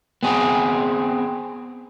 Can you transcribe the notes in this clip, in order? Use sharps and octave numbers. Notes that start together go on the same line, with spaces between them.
B3 C4 G#4